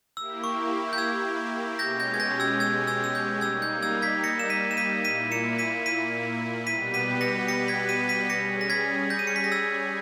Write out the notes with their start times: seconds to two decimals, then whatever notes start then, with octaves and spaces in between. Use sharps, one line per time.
0.17 A#3 E4 G4 E6
0.44 C#6
0.93 G6
0.98 E6 G#6
1.79 B2 G#3 C#4 G4 G6 A#6
2.00 G6 A#6
2.14 G#6
2.20 G6 A#6
2.40 E6 G#6
2.60 E6 G#6
2.87 E6 G#6
3.04 E6
3.15 G6
3.41 G3 A#3 D#4 E6 G#6
3.62 G6
3.82 E6 G#6
4.02 G#6 B6
4.24 A#6 C#7
4.39 E7
4.50 B6 D#7
4.71 E7
4.77 B6 D#7
5.04 A#2 A#3 E4 B6 D#7
5.31 C#7 E7
5.59 B6 D#7
5.86 B6 D#7
6.66 B2 G3 B3 G4 B4 B6 D#7
6.94 B6 D#7
7.21 A#6 C#7
7.48 A#6 C#7
7.68 G#6 B6
7.89 B6 D#7
8.09 B6 D#7
8.30 G3 C#4 G#4 A#6 C#7
8.61 A#6
8.70 G#6 B6
9.10 G6 A#6
9.19 D#7
9.27 C#7
9.36 B6
9.44 A#6
9.52 E6 G#6